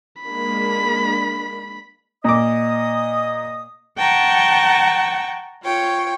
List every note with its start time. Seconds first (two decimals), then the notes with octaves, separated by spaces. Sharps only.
0.22 G#3 A#3 D4 B5
2.24 A#2 D#5 D6 D#6
3.98 F#5 G5 A5 A#5 C#6
5.63 F4 C#5 G5